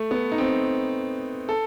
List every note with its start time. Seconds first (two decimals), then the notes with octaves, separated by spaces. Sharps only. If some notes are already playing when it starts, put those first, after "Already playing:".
Already playing: A3
0.11 B3
0.32 D#4
0.38 C4
1.49 A4